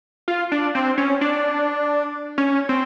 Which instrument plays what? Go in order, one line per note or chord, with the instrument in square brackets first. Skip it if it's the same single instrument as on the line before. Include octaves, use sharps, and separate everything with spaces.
[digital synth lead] F4
D4
C4
C#4
D4
C#4
C4